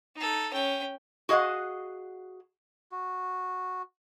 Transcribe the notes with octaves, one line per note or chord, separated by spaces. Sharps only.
D#4 A4
C#4 G5
F#4 G#4 D#5 F5 F#5
F#4